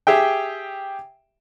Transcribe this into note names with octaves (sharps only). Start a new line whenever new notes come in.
G4 G#4 E5 G5